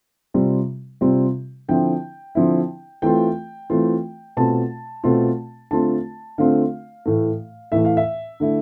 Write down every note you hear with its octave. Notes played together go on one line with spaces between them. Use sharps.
C3 G3 C4 F4
C3 G3 C4 F4
D3 F3 C4 E4 G5
D3 F3 C4 E4
E3 A3 C4 F4 G5
E3 A3 C4 F4
B2 A3 C4 F4 A5
B2 A3 C4 F4
D3 A3 C4 F4 A5
D3 A3 C4 F4 F5
A2 E3 A3
A2 E3 A3 E5
F5
E5
D3 A3 E4